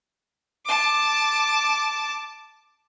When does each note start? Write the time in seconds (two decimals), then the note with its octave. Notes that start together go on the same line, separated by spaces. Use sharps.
0.66 A5 D6